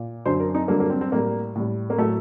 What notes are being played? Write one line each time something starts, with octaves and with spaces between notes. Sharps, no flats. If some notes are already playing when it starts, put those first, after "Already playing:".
Already playing: A#2
F#2 D3 F#3 C5
A#4
D#4
G2 D3 F#3 A#3
A#3
C4
C4
A2 G3 A#3
A2 G3
A#3
A2 F#3 A3